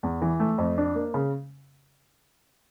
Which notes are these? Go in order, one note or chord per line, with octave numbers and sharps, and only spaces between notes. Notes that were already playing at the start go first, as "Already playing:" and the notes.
E2
E3
A3
F2
D4
A#3
C#3